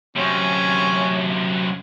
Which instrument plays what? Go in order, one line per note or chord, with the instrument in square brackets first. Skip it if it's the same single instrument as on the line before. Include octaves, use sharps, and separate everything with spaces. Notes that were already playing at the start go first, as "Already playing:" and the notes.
[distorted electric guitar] F#2 C3 [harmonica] C#4